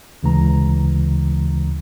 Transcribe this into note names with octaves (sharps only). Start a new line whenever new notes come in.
D2 C#3 E3 G#3 A#5